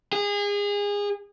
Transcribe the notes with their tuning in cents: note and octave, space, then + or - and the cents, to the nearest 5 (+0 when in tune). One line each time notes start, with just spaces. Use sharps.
G#4 -30